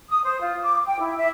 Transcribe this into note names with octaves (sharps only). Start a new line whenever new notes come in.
D#6
C5
F4
D6
G5
E4
E5